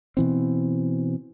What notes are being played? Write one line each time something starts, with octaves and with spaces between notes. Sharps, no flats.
B2 E3 C4